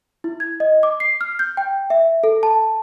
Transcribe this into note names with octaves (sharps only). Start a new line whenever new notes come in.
E4
G#6
D#5
D6
C7
F6
G6
G5
E5
A4
A5